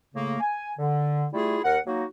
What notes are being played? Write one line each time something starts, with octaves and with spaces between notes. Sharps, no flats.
A2 C#3 A3 A#3
G#5
D3
G3 A3 E4 F4 G#4
D#2 A#4 F#5
F#3 A#3 D#4 F#4